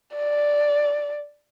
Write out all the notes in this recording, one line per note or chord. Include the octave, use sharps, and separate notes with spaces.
D5